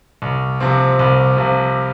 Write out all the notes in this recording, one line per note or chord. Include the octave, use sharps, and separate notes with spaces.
C2
C3 F3 C4
C2
C3 F3 C4